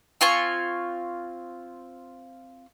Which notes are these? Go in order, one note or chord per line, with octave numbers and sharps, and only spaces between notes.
C4 F4 G#5 C#6